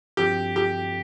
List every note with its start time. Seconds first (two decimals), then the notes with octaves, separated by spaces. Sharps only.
0.17 G2 F3 C4 G4
0.56 G4